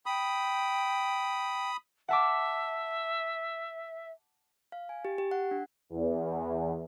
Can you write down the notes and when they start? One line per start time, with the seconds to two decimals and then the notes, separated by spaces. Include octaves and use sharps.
0.06 G5 B5 D#6
2.08 E5 F#5 A5 D6
4.72 F5
4.89 G#5
5.05 G4
5.18 G4
5.31 F#5
5.51 D4
5.90 E2